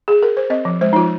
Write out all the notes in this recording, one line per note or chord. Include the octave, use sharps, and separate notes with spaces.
G#4
A#4
C5
C4 D#5
F3
G#3 C5
D#4
F3 F4